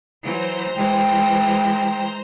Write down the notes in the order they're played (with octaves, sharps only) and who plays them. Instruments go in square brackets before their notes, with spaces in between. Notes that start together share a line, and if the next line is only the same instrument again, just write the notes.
[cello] E3 F#3 [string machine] C5 A#5
[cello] E3 G#3 [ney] G5